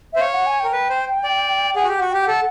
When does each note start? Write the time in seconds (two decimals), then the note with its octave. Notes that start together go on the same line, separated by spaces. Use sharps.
0.13 E5
0.16 C5
0.21 C#5 F5
0.34 F#5
0.46 G#5
0.60 A#4 G5
0.73 B4
0.89 C5
1.24 D5
1.76 G#4 F#5
1.84 F#4
1.88 G4 G5
1.99 F#4 F#5
2.11 G4 G5
2.23 A4 F#5